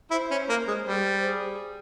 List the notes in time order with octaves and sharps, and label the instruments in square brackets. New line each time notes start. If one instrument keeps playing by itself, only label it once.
[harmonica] E4 [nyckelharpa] C5
[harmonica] C#4
A#3
G#3
[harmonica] G3 [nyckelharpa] C5
[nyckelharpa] G#4